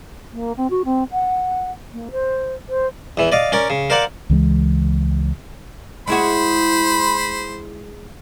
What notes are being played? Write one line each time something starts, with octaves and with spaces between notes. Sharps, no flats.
A#3
C4
F#4
C4
F#5
A#3
C5
C5
E2 E3
D5 D#5 F5
C#4 A#4 D5
C#3
A#4 C5 D5 F5 F#5
C#2 E3 G3 G#3
G#3 E4 F#4 C5 B5